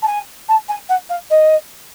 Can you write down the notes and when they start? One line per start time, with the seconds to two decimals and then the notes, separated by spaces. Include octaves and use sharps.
0.02 A5
0.07 G#5
0.48 A5
0.68 G#5
0.89 F#5
1.09 F5
1.30 D#5